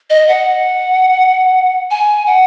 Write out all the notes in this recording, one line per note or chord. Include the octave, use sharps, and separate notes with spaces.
D#5
F#5
G#5
F#5